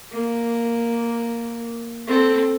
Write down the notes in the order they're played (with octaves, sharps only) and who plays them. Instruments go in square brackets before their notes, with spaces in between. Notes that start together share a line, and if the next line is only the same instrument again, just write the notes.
[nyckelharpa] A#3
C4 A4